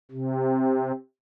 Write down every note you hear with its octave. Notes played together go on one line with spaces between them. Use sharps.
C3